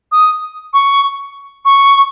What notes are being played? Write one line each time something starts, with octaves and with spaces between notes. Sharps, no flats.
D#6
C#6
C#6